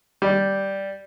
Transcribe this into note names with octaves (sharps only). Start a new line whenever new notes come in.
G3